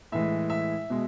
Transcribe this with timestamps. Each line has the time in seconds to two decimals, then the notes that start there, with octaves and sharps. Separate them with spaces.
0.12 A2 E3 G#3 E5
0.50 E5
0.90 B2 G#3